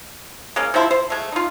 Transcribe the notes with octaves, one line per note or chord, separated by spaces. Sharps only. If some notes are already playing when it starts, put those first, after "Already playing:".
G#3 A#3 C#4
C3 F3 E4 C6
C5
G#3 A3
D#4 F4